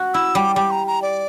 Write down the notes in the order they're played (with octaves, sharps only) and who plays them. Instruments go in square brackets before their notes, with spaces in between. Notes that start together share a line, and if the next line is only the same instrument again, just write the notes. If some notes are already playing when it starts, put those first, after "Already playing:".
Already playing: [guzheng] F#4
[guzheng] E4 [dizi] E6
[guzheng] G3 [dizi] D6
[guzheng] G3 [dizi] D6
[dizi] A#5
A#5
D5